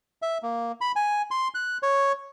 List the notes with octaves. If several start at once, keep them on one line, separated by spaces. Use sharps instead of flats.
E5
A#3
B5
G#5
C6
F#6
C#5